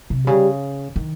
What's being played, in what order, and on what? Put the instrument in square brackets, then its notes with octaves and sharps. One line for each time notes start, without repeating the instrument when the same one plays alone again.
[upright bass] C3
[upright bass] C#3 [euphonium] G3
[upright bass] D#3